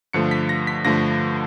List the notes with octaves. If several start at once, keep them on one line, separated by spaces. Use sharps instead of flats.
G2 D3 F3 A3 C#7
B6
A#6
B6
G2 D3 F3 A3 A#6